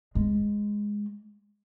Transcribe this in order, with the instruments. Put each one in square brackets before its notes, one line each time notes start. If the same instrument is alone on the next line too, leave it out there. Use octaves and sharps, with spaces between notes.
[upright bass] G#3